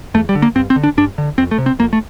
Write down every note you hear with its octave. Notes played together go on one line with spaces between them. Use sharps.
E2 A3
G3
D3
A#3
G2 C4
C4
D3
D4
G2 D4
D3
F2 C4
A3
C3
C4
F2 A#3
A3